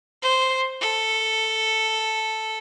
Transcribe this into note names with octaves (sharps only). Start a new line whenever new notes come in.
C5
A4